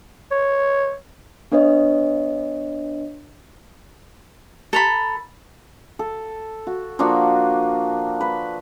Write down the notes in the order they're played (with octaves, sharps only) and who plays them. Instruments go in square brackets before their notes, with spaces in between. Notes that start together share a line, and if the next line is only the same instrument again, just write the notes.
[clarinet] C#5
[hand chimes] B3 D4 B4 C#5 D#5
[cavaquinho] A4 A#5 B5
[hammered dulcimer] A4
F#4
F3 A#3 D4 F#4
B4